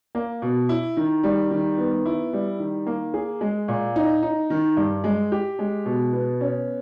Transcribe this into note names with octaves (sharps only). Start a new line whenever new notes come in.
A#3
B2
E4
D#3
G3
D#3
B3
E4
G3
D#3
A#3
G#4
G#3
A#2
D#4
D#4
D#3
G2
G#3
G4
G#3
B2
B3
C#4